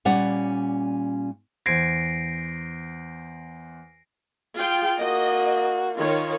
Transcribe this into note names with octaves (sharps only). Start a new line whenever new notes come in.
A#2 G3 C#4 D5 F#5
E2 C5 G#6 A#6 C7 D7
F4 G#4 G5
A#3 F#4 D#5
D#3 F4 C#5